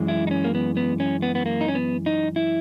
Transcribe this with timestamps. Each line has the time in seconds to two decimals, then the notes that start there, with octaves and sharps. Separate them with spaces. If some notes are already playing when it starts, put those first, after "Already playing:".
Already playing: F#2 E3 G#3
0.08 E4
0.27 D#4
0.31 C#4
0.45 A#3
0.55 B3
0.77 B3
1.00 C#4
1.22 B3
1.35 B3
1.46 A#3
1.61 D#4
1.68 C#4
1.75 B3
2.06 D#4
2.36 E4